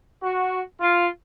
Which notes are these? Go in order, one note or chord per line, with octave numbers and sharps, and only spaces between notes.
F#4
F4